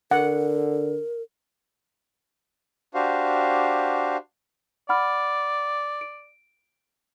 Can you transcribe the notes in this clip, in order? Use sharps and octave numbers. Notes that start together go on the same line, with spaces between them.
D3 A#4 F#5
D4 F#4 G4 C5 F5
D5 F#5 B5 F6
D7